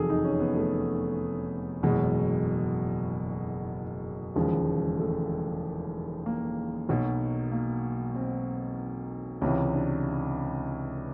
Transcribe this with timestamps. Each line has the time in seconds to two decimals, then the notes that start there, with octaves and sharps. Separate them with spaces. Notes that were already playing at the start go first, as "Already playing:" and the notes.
Already playing: F1 E2 C3 D#3 F#3 G#4 A4
0.10 D#4
0.25 C#4
0.40 B3
0.56 A3
1.83 F#1 E2 B2 F#3 G#3
4.36 E1 D#2 C#3 F3 G#3
4.99 A3
6.26 A#3
6.89 B1 B2 F#3
7.52 A#3
8.15 C4
9.41 C#2 C3 E3 C#4
9.73 D4